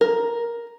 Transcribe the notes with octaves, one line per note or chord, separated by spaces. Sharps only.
A#4